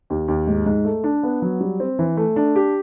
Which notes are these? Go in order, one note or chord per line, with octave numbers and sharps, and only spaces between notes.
D#2
D#2
G#2
G#2
A3
D4
B3
F#3
G3
C4
E3
A3
D4
G4